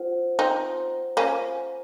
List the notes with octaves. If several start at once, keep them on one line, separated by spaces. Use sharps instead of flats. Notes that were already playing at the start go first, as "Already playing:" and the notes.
Already playing: F4 C5 F#5
C4 D#4
A#3 C#4